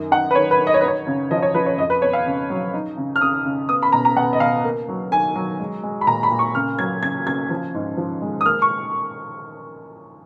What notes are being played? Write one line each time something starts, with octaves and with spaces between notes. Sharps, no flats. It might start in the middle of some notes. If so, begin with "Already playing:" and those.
Already playing: F#2 D#3
D#4 F#5
B4
D#3 C#5
B4
D#3
D#5
C#5
D#4 B4
C#5
C#3
F3 D#5
C#5
F3 B4
C#5
F2 D#5
B4
B3 C#5
F5
C#3
F#3
D#4
C#3
F6
C#3 D#6
C#3
B3 D#6
B5
B2 A#5
A#5
B2 F#5
D#5
B2 F5
A#3
F#3
D#3 G#5
F#3
G#3
G#3
B5
A#2 A#5
B5
A#2
C#6
C#3 F6
F#3 G#6
C#3 G#6
C#3 G#6
F3
G#2
F3
G#3
D#6
A#3 F6
C#6